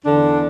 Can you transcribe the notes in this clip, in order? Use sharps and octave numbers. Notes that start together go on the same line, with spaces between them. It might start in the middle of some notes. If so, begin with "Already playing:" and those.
E2 D3 E3 D4